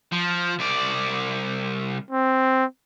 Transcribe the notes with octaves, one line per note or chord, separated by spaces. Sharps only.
F3
C2 D5
C4